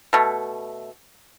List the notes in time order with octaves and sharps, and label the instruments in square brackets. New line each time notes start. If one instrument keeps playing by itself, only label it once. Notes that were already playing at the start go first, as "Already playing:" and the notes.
[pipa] B2 A3